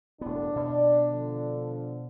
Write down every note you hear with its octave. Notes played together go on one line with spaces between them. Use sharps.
E1 A2 B3 D4
B2 D5
D3 F3